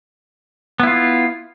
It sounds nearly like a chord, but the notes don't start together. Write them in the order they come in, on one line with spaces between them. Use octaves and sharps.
B3 E4 F4